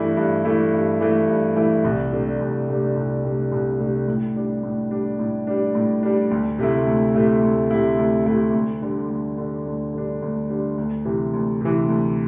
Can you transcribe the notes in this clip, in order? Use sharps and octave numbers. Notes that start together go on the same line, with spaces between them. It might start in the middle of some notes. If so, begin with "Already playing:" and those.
Already playing: G2 E3 A3 E4
G2
E3 A3 E4
G2
E3 A3 E4
G2
E3 A3 E4
C2
C3 A3 D4
C2
C3 A3 D4
C2
C3 A3 D4
C2
C3 A3 D4
A2
G3 D4
A2
G3 D4
A2
G3 D4
A2
G3 D4
D2
C3 A3 E4
D2
C3 A3 E4
D2
C3 A3 E4
D2
C3 A3 E4
D2
D3 G3 D4
D2
D3 G3 D4
D2
D3 G3 D4
D2
D3 G3 D4
D2
C3 E3
D2
C3 E3
D2